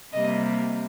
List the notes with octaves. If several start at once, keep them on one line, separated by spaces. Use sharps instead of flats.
C3 G3 A#3 D#5